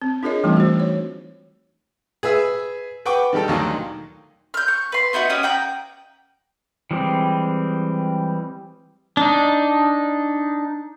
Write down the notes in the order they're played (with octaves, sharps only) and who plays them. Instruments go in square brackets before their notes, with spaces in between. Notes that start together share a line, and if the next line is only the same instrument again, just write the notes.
[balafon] C4
D4 F4 G#4 A#4 C#5 D#5
E3 G3 A3 C4 D#4 F4
F#4 C5
C#5
[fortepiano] G#4 B4 E5 E6
B4 F#5 G5 C#6 D6
D#3 G3 G4 A4 G5
D2 A#2 D#3 F#3 D#5
[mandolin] F6 G6
C#6
B4 C6
B3 D#4 E4 F#4
C#4 G4 D#6
F#5 G5 A#5
[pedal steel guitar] E3 G3 G#3 C4
D4 D#4